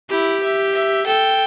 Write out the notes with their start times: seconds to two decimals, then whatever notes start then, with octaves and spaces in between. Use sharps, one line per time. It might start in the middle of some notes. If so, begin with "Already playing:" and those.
0.10 E4 G4
0.43 E5
0.75 E5
1.07 A4 G5